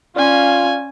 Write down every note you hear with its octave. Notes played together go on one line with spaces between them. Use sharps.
C#4 F4 D5 F5 G#5 C6